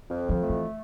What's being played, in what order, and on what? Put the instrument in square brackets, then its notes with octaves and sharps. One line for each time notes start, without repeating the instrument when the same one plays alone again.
[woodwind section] F2
[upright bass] F3
[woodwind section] A3
[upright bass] E3